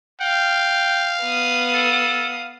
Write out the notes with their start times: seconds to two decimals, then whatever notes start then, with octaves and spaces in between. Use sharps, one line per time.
0.21 F5 G5
1.22 B3 D#6
1.74 A4